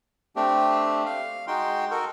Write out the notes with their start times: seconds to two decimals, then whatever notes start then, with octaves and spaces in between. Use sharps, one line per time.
0.36 A3 C4 D4 G4
1.06 F5
1.47 G#3 D#4 F#4 G5 C6
1.91 F#4 A4 A#4